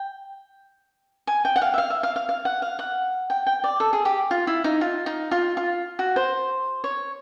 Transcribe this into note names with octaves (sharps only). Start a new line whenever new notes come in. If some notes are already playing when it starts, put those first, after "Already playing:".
Already playing: G5
G#5
G5
F#5
F5
E5
F5
E5
F5
F5
F5
F#5
F5
F#5
G5
G5
D5
A4
G#4
G4
F4
E4
D#4
F4
D#4
F4
F4
F#4
C5
C#5